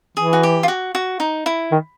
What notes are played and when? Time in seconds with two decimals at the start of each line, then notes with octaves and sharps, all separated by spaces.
0.17 E3 G#4
0.33 F#4
0.43 G4
0.63 F4
0.68 F#4
0.95 F#4
1.20 D#4
1.46 E4
1.72 D#3